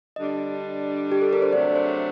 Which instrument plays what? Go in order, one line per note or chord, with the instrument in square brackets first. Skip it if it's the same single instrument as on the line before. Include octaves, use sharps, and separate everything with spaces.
[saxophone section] D3 G3 D4 [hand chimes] D#5
[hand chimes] G4
A4
A#4
C5
[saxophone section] C3 F#3 A3 D4 [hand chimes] D5
[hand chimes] C5